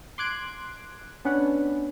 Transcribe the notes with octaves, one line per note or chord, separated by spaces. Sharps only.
C6 D6 F#6 G#6 D7
B3 C#4 D4 B4 F#5